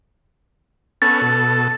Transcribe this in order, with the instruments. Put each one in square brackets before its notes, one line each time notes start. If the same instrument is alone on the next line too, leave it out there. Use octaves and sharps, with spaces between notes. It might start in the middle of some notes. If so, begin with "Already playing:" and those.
[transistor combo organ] B3 C#4 A4 [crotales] A6
[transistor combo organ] B2 A4